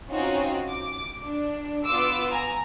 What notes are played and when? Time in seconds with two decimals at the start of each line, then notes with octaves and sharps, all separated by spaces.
0.11 C4 C#4 D#4 F4 F#4
0.70 D6
1.23 D4
1.85 B3 F4 D6 E6
2.31 G#5 A#5